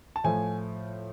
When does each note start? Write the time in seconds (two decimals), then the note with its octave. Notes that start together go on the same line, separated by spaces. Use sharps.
0.16 A5
0.24 A2 F3 A3 G#5